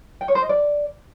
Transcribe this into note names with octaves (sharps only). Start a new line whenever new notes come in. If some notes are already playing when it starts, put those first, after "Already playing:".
G5
C#5
C5
D#5
D5